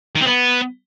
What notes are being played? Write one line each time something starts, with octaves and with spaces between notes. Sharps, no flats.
D#3
C4
B3